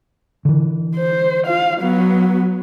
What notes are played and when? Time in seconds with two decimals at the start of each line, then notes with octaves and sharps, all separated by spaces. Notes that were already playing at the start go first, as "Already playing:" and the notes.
0.45 D3 E3
0.96 C5
1.47 F4 F5
1.80 F#3 B3